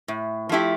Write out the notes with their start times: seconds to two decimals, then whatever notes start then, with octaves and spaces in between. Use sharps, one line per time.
0.08 A2
0.49 F3 A3 E4 G4